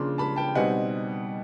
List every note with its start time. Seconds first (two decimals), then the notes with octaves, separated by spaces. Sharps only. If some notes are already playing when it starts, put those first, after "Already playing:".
Already playing: C#3 F3 A#3 D4 C6
0.18 A5 B5
0.36 G5 A5
0.55 B2 G3 C4 D#4 F#5 G#5